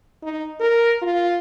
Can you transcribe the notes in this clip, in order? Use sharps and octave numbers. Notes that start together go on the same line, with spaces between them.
D#4
A#4
F4